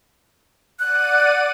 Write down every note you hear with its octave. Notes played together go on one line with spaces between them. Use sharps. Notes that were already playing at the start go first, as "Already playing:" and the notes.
D5 F#5 F#6 D#7